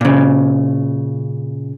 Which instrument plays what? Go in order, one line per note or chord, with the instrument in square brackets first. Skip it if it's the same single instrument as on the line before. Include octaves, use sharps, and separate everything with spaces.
[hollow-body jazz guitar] A#2 C#3